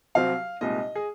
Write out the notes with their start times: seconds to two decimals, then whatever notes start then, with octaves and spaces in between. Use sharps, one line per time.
0.15 C2 C3 F#3 C4 F5
0.61 C2 A#2 G#3 D#4 D#5
0.95 G#4